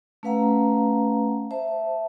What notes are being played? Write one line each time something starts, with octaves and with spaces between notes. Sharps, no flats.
A3 C#4 B4 F5 F#5 A#5
C5 E5 A5